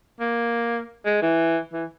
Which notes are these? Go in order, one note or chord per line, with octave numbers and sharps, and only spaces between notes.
A#3
G#3
E3
E3